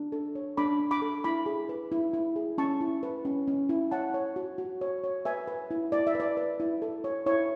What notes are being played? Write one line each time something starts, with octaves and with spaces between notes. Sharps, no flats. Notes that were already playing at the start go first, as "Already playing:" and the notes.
Already playing: D4
A4
C#5
D4 B5 D6
D4
B5 D6
A4
E4 B5 D6
G#4
B4
E4
E4
G#4
C#4 A5 C#6
E4
B4
C#4
C#4
E4
C#5 F#5 A5
C#5
F#4
F#4
C#5
C#5
B4 E5 G#5
B4
E4
E4 D5
E5
B4
D5
B4
E4
A4
C#5
E4 C#5